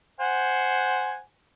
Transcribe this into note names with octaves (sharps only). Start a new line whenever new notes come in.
C5 F#5 G#5